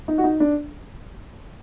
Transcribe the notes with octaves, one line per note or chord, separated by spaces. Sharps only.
D#4
F#4
D#4
D4